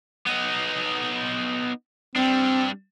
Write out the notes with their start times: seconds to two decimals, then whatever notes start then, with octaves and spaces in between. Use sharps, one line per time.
0.27 B3 D#4
2.16 G3 C4 D4